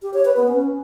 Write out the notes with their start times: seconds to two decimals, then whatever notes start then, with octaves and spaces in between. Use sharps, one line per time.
0.02 G4
0.14 C#5
0.25 B4
0.36 B3
0.48 C#4